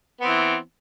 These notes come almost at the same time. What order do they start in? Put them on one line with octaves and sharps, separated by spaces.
B3 C4 E3